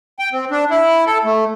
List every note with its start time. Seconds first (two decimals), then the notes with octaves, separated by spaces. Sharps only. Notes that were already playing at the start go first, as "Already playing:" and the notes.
0.19 G5
0.33 C4
0.51 D4
0.71 E4
1.07 A4
1.25 A3